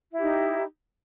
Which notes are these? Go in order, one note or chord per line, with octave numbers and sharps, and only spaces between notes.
D#4 E4 G4